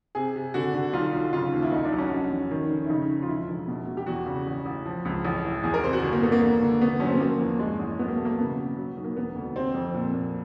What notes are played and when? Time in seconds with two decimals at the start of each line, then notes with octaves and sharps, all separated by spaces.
0.15 C3 G#4
0.36 C3
0.54 D3 F#4
0.74 D3
0.93 B1 F4
1.13 B1
1.33 C#3 F4
1.52 D#2
1.62 E4
1.72 C2 D#4
1.84 D4
1.92 F#3
1.98 C#4
2.11 F1
2.30 E2
2.51 D#3
2.69 F1
2.85 E4
2.90 C#3 D#4
3.09 F3
3.22 F4
3.28 E1 E4
3.48 E1
3.67 B2
3.87 B2
3.97 G4
4.06 E2 F#4
4.26 C#3
4.47 A1
4.66 A1
4.85 F3
5.05 C#2
5.25 A1
5.44 E3
5.63 E2 G#4
5.74 A#4
5.83 C3 C5
5.93 F#4
6.03 G1
6.12 A#3
6.23 D3 B3
6.32 A#3
6.41 E1
6.61 D3
6.81 G1 B3
7.00 F#3 C#4
7.07 C4
7.14 B3
7.20 F3 A#3
7.40 E2
7.59 G2 G#3
7.79 A1
7.99 F#3 B3
8.08 A#3
8.16 B2 A3
8.25 A#3
8.39 C#3 B3
8.58 F#3
8.77 F#3
8.97 B1
9.04 A#3
9.16 E1 B3
9.35 D2
9.55 C3 C4
9.74 F2
9.94 A#2
10.14 A#2